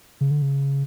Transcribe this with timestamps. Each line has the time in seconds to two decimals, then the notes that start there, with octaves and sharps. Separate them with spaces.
0.21 C#3
0.31 D3
0.42 C#3